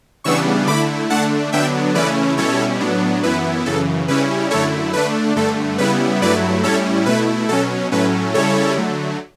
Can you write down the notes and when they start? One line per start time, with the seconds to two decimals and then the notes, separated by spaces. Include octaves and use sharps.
0.24 C#3 E3 G3 B3 D4 C#6 E6
0.67 D3 A3 E4 B5 D6
1.10 D3 A3 D4 F#5 A5
1.52 D3 F#3 B3 D4 E5 G5
1.95 C#3 E3 A3 C#4 E4 B4 D5
2.37 B2 G3 C#4 E4 A4 C#5
2.80 A2 F#3 B3 D4
3.23 F#2 E3 B3 E4 B4
3.66 F#2 C#3 E3 A4
4.08 C#3 G3 C#4 E4 B4
4.51 F#2 D3 A3 E4 A4 C#5
4.93 D3 A3 D4 B4
5.36 G2 D3 A3 A4
5.78 C#3 G3 B3 E4 B4
6.21 G2 F#3 A3 E4 B4 D5
6.63 A2 G3 C#4 E4 A4 C#5
7.06 B2 A3 E4 B4
7.49 B2 F#3 C#4 A4
7.92 A2 F#3 A3 C#4 B4
8.34 C#3 G3 C#4 E4 A4 C#5
8.77 D3 F#3 A3